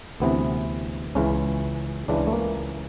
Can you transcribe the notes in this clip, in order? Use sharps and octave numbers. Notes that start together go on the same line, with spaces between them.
D2 C3 E3 B3
C#2 C#3 E3 C#4
C#2 C#3 E3 D4
A3
A#3